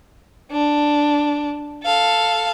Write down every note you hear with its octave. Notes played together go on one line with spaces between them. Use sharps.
D4
A4 F5